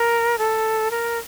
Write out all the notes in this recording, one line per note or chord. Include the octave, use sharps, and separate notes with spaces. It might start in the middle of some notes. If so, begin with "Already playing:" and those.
Already playing: A#4
A4
A#4